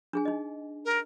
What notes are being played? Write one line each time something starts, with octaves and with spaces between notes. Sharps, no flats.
D4 G#4 G#5
D#4 D#5
A#4